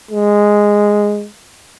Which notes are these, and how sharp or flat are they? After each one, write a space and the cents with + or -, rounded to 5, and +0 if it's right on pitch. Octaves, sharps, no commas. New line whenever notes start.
G#3 -5